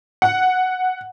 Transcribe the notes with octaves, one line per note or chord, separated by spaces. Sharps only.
F#5